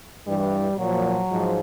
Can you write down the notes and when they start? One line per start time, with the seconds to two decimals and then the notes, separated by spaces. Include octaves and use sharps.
0.27 G2 E3 G3
0.78 A#2 F3 F#3
1.30 G#2 F3